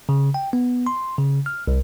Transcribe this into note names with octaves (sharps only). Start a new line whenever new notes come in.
C#3
G5
B3
C6
C#3
F6
C2